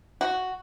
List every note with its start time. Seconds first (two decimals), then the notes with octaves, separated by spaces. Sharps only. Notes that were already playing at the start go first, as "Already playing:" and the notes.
0.21 F#4